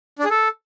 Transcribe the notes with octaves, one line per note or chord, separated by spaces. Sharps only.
D4
G#4
A4